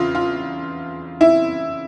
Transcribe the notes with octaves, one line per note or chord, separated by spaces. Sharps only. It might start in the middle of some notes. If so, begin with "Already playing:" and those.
Already playing: E2 C#3 F4
F4
E4